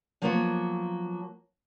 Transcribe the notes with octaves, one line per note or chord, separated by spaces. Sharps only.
F3 F#3 A#3 B3 F4 C#5